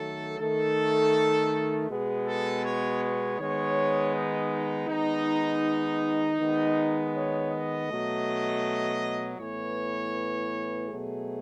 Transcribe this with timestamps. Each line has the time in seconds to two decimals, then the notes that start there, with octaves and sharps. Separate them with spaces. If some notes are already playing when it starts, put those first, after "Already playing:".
Already playing: D#3 F#3 A3 A4
0.39 D#3 A3 A4
1.89 B2 G#3 B3 G#4
2.27 A4
2.64 C#5
3.01 C#5
3.39 D#3 G#3 B3 C#5
4.14 D#4
4.51 D#4
4.88 D#3 G#3 B3 D#4
6.39 D#3 G#3 B3
7.14 C#5
7.51 D#5
7.88 B2 F#3 A3
9.39 A2 E3 B3 C#5
10.88 B2 F#3 A3 G#4